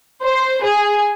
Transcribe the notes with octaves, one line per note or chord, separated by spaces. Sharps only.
C5
G#4